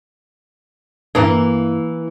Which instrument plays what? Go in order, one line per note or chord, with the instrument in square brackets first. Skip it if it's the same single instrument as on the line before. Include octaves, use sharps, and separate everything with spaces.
[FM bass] G2 [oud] E3 A#3